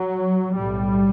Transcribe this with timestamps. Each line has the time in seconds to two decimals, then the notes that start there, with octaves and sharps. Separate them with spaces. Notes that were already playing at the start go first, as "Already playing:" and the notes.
Already playing: F#3
0.54 B1 A2 G3